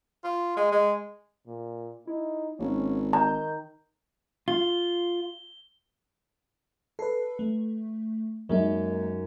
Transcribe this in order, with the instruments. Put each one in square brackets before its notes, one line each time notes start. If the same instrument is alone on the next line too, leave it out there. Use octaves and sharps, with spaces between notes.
[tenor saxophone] F4
G#3
G#3
[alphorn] A#2
[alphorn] D#4 [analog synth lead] E4
[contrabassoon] G#1 [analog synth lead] A#3 [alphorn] C#4
[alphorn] D#3 [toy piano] A#5 [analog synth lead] G6
[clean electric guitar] F4 [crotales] G7
[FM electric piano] A4 B4 [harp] C7
[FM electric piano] A3
[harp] F#2 [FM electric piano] G#3 A#3 D#4